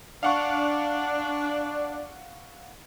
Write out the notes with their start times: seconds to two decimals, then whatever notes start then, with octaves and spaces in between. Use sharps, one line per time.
0.23 D4 F5 F#5 C#6